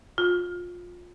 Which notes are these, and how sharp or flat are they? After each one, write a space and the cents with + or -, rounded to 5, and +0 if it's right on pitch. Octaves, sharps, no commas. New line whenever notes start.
F4 +20